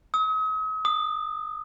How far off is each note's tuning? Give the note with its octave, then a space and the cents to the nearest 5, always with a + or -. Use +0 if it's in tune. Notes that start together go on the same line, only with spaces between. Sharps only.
D#6 +40
D#6 -25